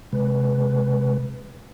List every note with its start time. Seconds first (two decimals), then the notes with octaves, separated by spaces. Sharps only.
0.13 C3 G#3 B4